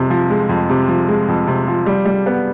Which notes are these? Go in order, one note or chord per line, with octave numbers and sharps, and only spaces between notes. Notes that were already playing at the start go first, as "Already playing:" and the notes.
Already playing: F2 C3
F3
G#3
F2
C3
F3
G#3
F2
C3
F3
G3
G3
B3